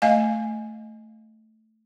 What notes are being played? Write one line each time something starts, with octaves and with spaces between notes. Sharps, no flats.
A3 D#5 F5 G#5